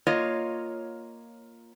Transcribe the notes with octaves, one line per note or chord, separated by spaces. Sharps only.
A#3 F4 C#5 D#5